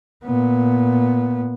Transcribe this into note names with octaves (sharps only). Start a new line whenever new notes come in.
A#2 B3